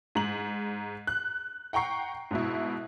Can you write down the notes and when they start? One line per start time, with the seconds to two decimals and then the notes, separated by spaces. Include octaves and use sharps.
0.15 G#2 A#5 F#7
1.07 F#6
1.73 F#5 G5 A#5 C#6 C7
2.31 G#2 B2 E4